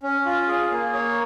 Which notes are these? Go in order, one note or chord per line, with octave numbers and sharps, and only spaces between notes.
C#4
F4
G#4
A#3
C#5